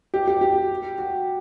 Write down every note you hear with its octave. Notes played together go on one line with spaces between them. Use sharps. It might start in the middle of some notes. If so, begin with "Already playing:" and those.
G4
G4
G4
F#4